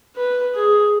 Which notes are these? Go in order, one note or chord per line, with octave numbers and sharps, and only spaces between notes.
B4
G#4